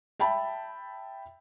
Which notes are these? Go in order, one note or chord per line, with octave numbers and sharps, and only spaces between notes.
E5 G5 A5 B5